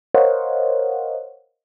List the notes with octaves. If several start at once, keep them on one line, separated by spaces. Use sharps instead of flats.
A#4 C5 C#5 D#5 F5 F#5